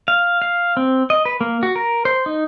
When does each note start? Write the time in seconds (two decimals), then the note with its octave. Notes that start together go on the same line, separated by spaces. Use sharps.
0.08 F5
0.42 F5
0.77 C4
1.10 D#5
1.25 B4
1.41 A#3
1.63 F#4
1.76 A#4
2.05 C5
2.26 D#4